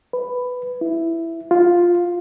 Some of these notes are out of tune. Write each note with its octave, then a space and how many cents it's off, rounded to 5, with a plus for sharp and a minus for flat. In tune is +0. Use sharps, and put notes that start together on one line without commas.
B4 +10
E4 +5
F4 +5